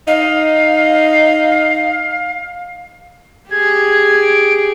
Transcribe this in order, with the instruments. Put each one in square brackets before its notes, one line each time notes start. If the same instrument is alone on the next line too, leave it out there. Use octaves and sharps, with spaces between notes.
[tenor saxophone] D#4 [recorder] F5
[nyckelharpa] G4 G#4 [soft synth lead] G#6
[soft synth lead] D7